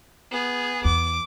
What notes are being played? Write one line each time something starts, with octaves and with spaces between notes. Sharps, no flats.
B3 G#4
E2 D6